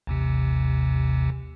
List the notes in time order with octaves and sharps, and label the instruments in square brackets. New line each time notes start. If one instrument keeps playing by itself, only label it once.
[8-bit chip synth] A1 D#2 C3